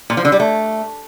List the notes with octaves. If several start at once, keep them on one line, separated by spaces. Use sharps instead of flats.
A#2
F3
D3
G3
A3